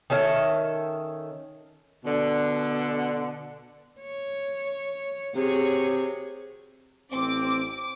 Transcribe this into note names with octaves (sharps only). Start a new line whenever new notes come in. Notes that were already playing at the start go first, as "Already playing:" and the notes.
D#3 C#4 A4 E5
B2 D3
C#5
C3 F#4 G#4 C#5
A1 C4 D6